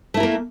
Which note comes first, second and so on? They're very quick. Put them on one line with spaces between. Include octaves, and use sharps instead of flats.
A3 E4 A#4 A#3